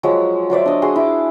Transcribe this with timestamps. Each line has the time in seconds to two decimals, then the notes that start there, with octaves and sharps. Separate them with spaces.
0.03 F3 F#3 G#3
0.50 F#3 C5 D5 E5
0.66 D4 D#5
0.82 F#4 G#4 C6
0.96 E4 D6